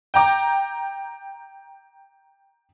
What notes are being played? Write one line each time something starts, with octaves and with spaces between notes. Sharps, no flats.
G5 A#5 D6